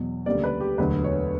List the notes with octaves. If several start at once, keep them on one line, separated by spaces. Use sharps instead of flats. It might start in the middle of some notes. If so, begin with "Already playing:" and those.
Already playing: E2 B2 F#3
D2 C#3 G3 A#3 D5
B4
G4
E1 D2 D3 F#3 B4
C#5